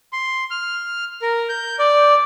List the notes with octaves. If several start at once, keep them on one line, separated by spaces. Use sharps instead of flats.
C6
F6
A#4
G6
D5